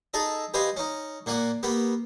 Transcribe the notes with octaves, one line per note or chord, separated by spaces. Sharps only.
D#4 G#4 A4 D#5
G4 B4 C5 D#5 F5 G#5
C#4 D#4
A#2 A#3 F#5 G#5 D6
A#3 B3 G4